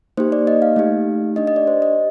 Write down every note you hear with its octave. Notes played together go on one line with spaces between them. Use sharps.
A#3 D#4 G4 C5
D5
D#5
F5
A3 D#4 G4
D4 G4 D#5
D#5
D5
C5
D#5